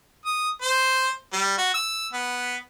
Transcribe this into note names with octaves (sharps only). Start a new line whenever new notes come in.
D#6
C5
G3
F#4
E6
B3